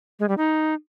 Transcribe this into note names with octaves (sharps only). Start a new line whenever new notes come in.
G#3
G3
D#4